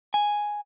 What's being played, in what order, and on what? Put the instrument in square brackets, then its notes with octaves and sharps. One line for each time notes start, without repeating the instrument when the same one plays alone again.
[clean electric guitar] G#5